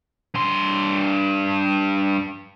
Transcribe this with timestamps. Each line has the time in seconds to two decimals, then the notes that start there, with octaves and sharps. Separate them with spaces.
0.34 G2 C6